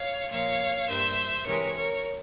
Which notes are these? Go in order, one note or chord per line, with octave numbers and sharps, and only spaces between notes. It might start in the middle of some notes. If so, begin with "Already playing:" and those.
Already playing: C#5 F5
A#2 F3 A#3 C#5 F5
G2 G3 A#3 C5 E5
C3 E3 G#3 A#4 C#5
A#4 C#5